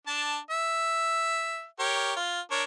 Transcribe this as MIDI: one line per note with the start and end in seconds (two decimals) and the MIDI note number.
0.07 0.37 62
0.07 0.37 81
0.50 1.64 76
1.79 2.14 67
1.79 2.14 70
1.79 2.14 73
2.16 2.40 65
2.51 2.63 62
2.51 2.63 70
2.51 2.63 73